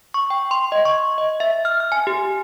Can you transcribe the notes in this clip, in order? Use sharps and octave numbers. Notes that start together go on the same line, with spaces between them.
C#6
G5
C6
D#5
C#6
D#5
E5
F6
F6
G#5
G4